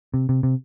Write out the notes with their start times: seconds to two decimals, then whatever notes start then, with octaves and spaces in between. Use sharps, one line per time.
0.14 C3
0.29 C3
0.43 C3